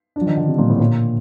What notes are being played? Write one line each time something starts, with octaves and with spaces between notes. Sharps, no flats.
D4
F3
D#3
D3
C3
A#2
A2
A#2